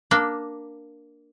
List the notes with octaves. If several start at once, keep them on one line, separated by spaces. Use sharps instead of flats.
A#3 D4